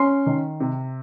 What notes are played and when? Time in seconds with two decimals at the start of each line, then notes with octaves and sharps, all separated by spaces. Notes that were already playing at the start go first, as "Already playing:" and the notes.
Already playing: C#4 C6
0.26 D#3
0.60 C3